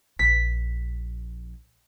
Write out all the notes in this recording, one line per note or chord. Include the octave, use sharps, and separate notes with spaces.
A#1 B6